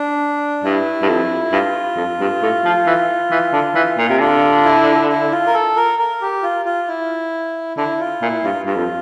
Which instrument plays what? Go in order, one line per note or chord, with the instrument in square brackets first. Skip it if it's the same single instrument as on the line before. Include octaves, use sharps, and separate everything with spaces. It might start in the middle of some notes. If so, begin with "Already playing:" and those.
Already playing: [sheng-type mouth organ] D4
[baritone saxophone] G2 [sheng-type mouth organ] E4
[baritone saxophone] G2
F2
[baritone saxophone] G2 [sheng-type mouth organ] F4
[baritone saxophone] F2
G2
A2
F3
E3
E3
D3
E3
A#2
C3
[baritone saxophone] D3 [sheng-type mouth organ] F4
[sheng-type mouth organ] E4
E4
F4
A#4
A4
A#4
A#4
G4
F4
F4
E4
[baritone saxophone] D3 [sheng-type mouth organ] E4
[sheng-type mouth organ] F4
[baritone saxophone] A#2 [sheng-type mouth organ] E4
[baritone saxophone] G2 [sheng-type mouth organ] F4
[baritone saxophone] G2 [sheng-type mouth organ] F4
[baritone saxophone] F2